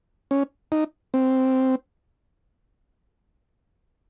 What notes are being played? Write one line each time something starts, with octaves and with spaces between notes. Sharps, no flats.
C#4
D#4
C4